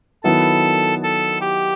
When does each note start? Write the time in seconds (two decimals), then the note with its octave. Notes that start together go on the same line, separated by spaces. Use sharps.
0.23 D#3 F#3 B3 E4 A4
1.03 A4
1.41 G4